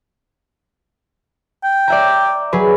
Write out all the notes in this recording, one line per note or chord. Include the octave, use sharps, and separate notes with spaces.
G5
D5 E5 A#5
F#3 G#4 B4